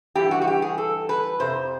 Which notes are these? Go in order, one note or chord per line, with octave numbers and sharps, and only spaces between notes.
G2 E3 G4
F#4
F#4
G4
G#4
A4
B4
F2 C3 C5